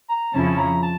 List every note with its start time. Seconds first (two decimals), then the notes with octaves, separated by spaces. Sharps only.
0.09 A#5
0.33 F2 C#3 F3 C#4 E4 A5
0.58 A#5
0.83 A5